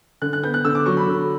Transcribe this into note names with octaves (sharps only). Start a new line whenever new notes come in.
D3 F#6
F#6
B3 G6
F#6
D3 E6
D6
F#3 C#6
B5
D3